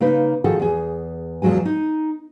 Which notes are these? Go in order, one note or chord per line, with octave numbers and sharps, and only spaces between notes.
C#3 A#3 D#4 B4
D#3 F3 F#4 G#4 A4
E2 G#4
E2 F3 F#3 G#3 G#5
D#4